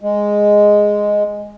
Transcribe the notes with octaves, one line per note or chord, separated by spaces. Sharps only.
G#3